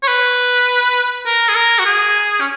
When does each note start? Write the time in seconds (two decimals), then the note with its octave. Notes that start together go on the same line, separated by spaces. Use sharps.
0.03 C#5
0.08 B4
1.26 A#4
1.49 G#4
1.56 A#4
1.79 F#4
1.86 G#4
2.41 C#4